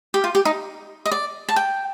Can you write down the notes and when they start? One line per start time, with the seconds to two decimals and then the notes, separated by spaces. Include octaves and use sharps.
0.14 G4
0.24 F4
0.35 G4
0.45 D#4
1.06 D#5
1.12 D5
1.49 A5
1.56 G5